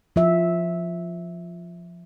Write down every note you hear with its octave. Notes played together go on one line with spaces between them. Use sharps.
F3 F4 E5